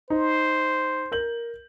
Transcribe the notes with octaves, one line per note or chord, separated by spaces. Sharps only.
D#4 C5
A#4 G6 F#7